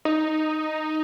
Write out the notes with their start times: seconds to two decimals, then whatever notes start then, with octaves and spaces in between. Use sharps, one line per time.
0.05 D#4